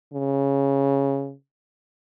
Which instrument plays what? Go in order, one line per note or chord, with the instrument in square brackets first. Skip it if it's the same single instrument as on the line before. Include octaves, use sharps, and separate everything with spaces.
[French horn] C#3